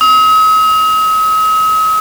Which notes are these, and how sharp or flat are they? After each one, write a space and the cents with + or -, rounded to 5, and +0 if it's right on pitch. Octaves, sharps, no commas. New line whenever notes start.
D#6 +45